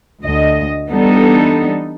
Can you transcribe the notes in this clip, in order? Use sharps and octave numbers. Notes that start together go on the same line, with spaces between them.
D2 D#5
E3 G3 B3 D4 D#4 A4